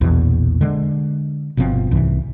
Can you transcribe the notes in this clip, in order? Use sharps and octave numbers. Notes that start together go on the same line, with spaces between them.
A#1 E2 B2
D3 G#3
G1 B2 F3 C4
C2 G#2 E3